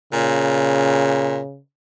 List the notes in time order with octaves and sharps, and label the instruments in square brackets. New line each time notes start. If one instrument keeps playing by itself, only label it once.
[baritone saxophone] A#2 [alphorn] C#3